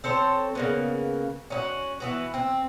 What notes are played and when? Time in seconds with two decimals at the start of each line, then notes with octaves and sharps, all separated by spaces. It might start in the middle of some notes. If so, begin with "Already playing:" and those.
0.04 C4 A4 C5 C#5
0.55 C#3 A#3 B3
1.50 C#4 D#4 F#4
2.00 E3 B3 F#4
2.34 C4